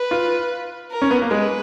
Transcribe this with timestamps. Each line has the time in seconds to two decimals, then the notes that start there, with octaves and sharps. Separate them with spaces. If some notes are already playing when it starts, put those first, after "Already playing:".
Already playing: B4
0.11 F4
0.91 A#4
1.02 C#4
1.11 B3
1.22 A#3
1.31 G#3 B4